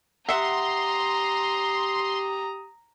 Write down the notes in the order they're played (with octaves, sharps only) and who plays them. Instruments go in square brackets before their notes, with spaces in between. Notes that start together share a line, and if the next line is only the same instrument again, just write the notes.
[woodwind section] G4 D#6 [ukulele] E5 F#5 [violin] A#5 [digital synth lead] C6